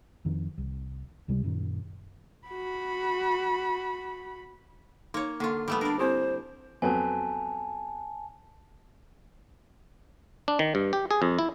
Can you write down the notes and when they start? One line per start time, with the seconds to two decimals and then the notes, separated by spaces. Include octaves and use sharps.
0.25 F2 D#3 F3
0.58 C2
1.28 C#2 C3 G3
1.43 F#2 A#2 D#3
2.48 F#4 B5
5.14 A#3 D#4 C#5
5.40 D3 A#3 F4 C#6
5.68 G3 A3 B3
5.81 D4 A#4 D5
5.99 C4 E4 G4 C5
6.82 F2 F#3 B3 G#5 A5
10.48 D4
10.59 D#3
10.75 G2
10.93 G4
11.11 G#4
11.22 F2
11.39 E4